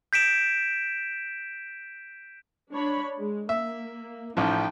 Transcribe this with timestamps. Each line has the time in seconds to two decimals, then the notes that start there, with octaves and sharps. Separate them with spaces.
0.13 G6 B6 D7 E7
2.71 D4 C#5 B5
3.17 G#3
3.49 A#3 E5
4.37 A1 F3 D#4 G5